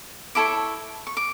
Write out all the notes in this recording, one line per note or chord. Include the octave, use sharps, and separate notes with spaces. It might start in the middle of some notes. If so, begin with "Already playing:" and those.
E4 A4 C#5 D6
C#6
D6